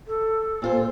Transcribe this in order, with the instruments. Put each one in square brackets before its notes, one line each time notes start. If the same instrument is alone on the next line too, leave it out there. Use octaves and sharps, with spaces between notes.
[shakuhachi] A4
[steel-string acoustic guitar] A#2 F4 C5